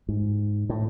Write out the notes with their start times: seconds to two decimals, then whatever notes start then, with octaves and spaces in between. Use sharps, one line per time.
0.09 G#2
0.69 A2